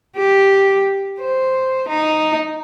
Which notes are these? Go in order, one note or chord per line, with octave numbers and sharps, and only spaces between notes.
G4
C5
D#4